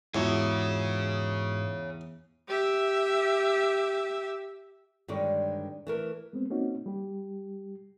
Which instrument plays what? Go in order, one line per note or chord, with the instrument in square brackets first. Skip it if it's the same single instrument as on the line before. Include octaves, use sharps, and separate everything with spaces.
[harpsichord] E2 [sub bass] G#2 [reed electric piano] G#3 F4 F#4 [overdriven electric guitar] G#4 C#5
[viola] G4 E5
[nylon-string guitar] G2 D3 D#3 G#3 C#5 D5
E3 A3 A#4
[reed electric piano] G#3 B3 C4
A#3 C4 C#4 D#4 F#4
G3 G4